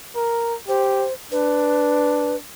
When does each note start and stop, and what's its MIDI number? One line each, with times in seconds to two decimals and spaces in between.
0.15 0.55 70
0.68 1.07 67
0.68 1.13 72
1.32 2.38 62
1.32 2.36 71